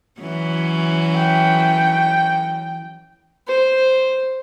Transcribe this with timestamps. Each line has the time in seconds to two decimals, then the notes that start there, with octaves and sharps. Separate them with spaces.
0.20 E3 F#3 C#4
1.15 G5
3.47 C5